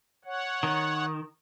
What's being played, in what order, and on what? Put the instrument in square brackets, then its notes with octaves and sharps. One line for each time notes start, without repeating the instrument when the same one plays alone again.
[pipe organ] C#5 F#5
[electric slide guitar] D#3